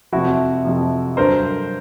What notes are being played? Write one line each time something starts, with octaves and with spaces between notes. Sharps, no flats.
F2 C3 F3 E4 F#4
F2 C3 F3
G2 D3 F#3 A#4 C5